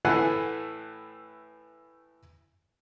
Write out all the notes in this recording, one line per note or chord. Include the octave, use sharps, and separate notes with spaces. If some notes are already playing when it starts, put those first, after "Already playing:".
A2 E3 A3 F#5 G#5